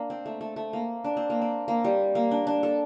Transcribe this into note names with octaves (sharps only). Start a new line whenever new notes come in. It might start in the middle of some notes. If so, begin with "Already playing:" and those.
Already playing: A#3 D4
C4
A3
A3
A3
A#3
D4
C4
A#3
C4
A#3
G3
A#3
D4
D4
A4